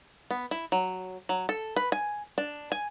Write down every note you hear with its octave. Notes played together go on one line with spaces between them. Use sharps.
B3
E4
F#3
F#3
A4
B4
G#5
D4
G#5